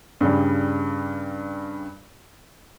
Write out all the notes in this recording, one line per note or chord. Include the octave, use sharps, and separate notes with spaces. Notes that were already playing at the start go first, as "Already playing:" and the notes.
G2 C#3 G3